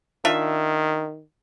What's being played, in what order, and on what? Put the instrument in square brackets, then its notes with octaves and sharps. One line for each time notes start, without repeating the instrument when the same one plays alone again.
[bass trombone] D#3 [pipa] D4 F4 E5